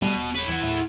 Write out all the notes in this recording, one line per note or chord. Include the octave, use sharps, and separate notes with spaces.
B2 G3 A3
D#1
B4 C#5
E2 E3 E4 F#5
D#2 A2 A3